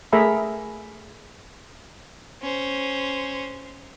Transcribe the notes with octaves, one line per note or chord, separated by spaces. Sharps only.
A3 G#4 A#4 E5 A#5 B5
C#4 C5